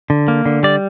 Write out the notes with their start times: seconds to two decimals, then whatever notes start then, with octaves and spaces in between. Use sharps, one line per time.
0.10 D3
0.28 A#3
0.46 D3
0.63 G3 D5